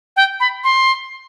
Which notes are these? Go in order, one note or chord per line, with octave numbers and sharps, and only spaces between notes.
G5
B5
C6